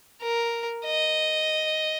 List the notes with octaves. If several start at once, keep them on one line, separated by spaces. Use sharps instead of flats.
A#4
D#5